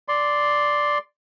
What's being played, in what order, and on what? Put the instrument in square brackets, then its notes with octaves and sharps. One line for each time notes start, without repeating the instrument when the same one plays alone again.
[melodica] D5 C6